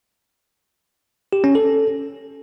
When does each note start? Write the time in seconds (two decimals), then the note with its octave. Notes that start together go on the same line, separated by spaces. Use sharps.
1.33 G4
1.44 C#4
1.55 A4